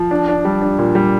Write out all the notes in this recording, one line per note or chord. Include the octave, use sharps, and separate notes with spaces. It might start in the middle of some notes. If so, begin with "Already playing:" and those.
Already playing: F3
D4
D4
G3
D4
A#2
G3